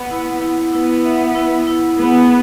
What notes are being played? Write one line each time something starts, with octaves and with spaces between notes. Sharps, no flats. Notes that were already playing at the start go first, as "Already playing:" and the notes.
Already playing: B3
E4
E4
B3 E4
E5
E4
E4
B3 G#4